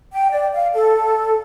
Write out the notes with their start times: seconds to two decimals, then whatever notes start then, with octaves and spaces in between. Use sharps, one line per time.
0.12 G5
0.30 D5
0.53 F5
0.73 A4